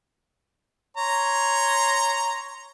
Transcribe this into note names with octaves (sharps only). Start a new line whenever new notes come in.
C#5 A#5 C6